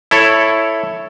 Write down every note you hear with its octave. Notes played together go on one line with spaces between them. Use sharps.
E4 A4 C#5